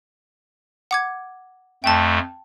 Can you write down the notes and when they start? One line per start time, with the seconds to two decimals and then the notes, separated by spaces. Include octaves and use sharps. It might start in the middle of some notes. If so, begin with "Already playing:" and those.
0.91 F#5 D6 G#6
1.84 F2 A3 G5 A5